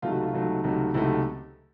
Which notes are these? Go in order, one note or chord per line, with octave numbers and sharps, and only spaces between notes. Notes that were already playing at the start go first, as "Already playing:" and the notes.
C#2 C3 D#3 F#3 A3 F4
F#4
F4
C#2 C3 D#3 F#3 A3
C#2 C3 D#3 F#3 A3
C#2 C3 D#3 F#3 A3 E4